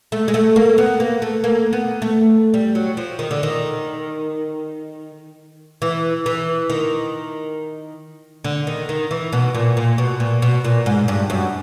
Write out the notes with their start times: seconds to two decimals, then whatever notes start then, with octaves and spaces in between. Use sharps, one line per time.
0.12 A3
0.28 G#3
0.34 A3
0.56 A#3
0.78 B3
1.00 A#3
1.22 A3
1.44 A#3
1.73 B3
2.02 A3
2.54 G3
2.75 F#3
2.97 F3
3.19 D#3
3.31 D3
3.43 D#3
5.82 E3
6.26 E3
6.70 D#3
8.44 D3
8.67 D#3
8.89 D#3
9.11 E3
9.33 B2
9.55 A#2
9.77 A#2
9.98 B2
10.20 A#2
10.42 B2
10.64 A#2
10.86 G#2
11.08 G2
11.30 F#2